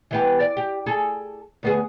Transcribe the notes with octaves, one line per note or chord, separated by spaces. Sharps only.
E3 B3 G4
D5
G4
G#4 A4
D2 B3 G#4